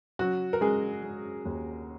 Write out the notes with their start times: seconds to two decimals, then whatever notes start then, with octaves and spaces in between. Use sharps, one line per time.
0.19 C#3 F#3 F#4
0.53 A#4
0.61 C#3 G#3 G#4
1.03 G#3
1.45 D#2